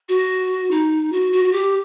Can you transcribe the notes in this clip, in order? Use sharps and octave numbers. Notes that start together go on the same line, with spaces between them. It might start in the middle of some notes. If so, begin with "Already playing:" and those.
F#4
D#4
F#4
F#4
F#4
G4